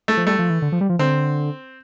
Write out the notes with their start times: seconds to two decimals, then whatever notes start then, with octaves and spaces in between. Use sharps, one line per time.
0.08 A3
0.17 F3
0.27 G3 A3
0.39 F3
0.50 E3
0.62 D3
0.72 F3
0.81 G3
0.89 F3
0.99 D3 C4